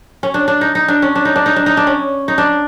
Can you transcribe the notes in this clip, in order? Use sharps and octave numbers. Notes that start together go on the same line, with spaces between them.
C#4
D4
D4
D#4
D#4
D4
C#4
D4
D#4
D4
D#4
D4
D#4
D4
C#4
D#4
D4